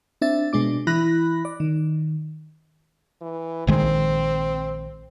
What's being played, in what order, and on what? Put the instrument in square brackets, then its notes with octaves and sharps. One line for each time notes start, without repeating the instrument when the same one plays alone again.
[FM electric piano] C4 D4 E5 A6
B2 G#3 D4 D6
E3 E4 B5 F#6 A#6
D5
D#3
[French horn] E3
[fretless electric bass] A#1 D#3 G#3 [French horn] C4